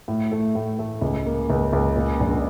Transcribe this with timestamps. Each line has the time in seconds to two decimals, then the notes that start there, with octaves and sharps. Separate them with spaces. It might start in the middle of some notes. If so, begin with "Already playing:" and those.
0.08 A2
0.32 A3
0.55 A2
0.79 A3
1.02 C#2
1.26 A#3
1.50 C#2
1.73 C#2
1.96 A#2
2.20 A#1